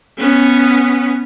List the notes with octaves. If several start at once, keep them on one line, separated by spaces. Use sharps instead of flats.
B3 C#4